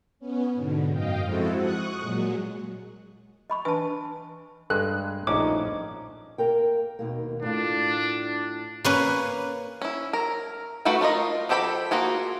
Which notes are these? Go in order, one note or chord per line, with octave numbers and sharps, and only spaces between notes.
B3 C#4
G#2 B2 D3
F#2 D#5 F5 G5
F3 G#3 C4 E4 F#4 A4
C#6 D#6 F#6
A#2 F#3 G#3
D#5 B5 C#6
E3 D4 B4 G#5 A5
G2 G#3 A4 F#6
A#1 A2 C#4 D#4 D6
A#3 A#4 G5
D#2 B2 A#3
A2 D4 F4
A#3 C#4 B4
C#4 E4
A#4
A3 F#4 B4 F5 G5
D4 F4 A#4 D#5
F3 G4 A4 G5 B5
A#3 F4 F#4 G#4